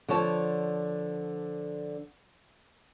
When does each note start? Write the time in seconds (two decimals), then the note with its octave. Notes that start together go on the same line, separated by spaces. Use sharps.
0.08 D3 F3 C#5 A5